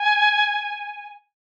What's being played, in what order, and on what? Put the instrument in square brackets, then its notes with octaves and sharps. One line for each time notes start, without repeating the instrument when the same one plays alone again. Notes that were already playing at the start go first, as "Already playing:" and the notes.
Already playing: [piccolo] G#5